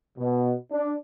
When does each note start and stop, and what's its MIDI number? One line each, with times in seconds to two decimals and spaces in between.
0.18 0.53 47
0.72 0.90 62